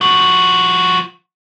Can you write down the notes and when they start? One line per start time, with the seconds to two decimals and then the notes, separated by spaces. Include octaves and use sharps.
0.01 F3 F#4